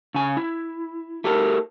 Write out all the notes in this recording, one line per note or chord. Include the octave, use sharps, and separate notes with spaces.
C#3 G#5
E4
A3 G4 A4 A#4